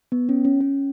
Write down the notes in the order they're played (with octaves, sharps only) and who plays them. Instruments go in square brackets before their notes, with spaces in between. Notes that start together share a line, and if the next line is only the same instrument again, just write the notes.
[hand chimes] B3
C#4
C#4
C#4